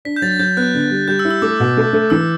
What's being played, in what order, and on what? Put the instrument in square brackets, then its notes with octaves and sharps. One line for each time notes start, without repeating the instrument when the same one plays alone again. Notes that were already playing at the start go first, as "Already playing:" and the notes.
[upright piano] D4 [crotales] B6
[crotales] G6
[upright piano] F#3 [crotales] A6
[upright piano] F#3 [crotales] G6
[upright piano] B3 [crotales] F#6
[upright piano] D3
G3
[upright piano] G3 [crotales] G6
[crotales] E6
[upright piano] E4
[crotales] E6
[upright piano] A3 [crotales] D6
[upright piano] B2
A3
A3
[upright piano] E3 [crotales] E6